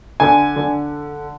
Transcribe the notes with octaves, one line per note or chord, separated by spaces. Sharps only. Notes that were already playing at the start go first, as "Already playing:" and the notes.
D3 G#5
D3